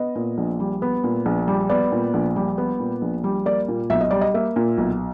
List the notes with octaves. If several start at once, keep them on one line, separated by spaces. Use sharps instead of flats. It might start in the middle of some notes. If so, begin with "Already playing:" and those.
Already playing: B3 D#5
A#2
A#1
G3
B3
A#2
A#1
G3
B3 D5
A#2
A#1
G3
B3
A#2
A#1
G3
A#3 D5
A#2
B1 E5
D#5
G3 D5
D#5
A#3 E5
A#2
B1